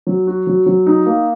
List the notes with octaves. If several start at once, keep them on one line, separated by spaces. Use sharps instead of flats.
F#3
F#4
F#3
F#3
D#4
A#3